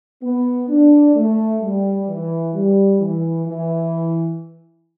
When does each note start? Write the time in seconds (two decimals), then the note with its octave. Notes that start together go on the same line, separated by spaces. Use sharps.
0.23 B3
0.69 D4
1.15 A3
1.61 G3
2.08 E3
2.54 G3
3.01 E3
3.46 E3